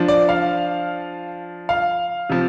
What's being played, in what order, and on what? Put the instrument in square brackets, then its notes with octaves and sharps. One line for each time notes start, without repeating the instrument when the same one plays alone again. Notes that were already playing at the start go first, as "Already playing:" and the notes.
Already playing: [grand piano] F3 D4
D5
F5
F5
C3 F3